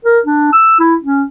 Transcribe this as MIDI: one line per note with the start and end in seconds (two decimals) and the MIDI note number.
0.05 0.19 70
0.26 0.52 62
0.53 0.77 88
0.79 0.96 64
1.04 1.24 61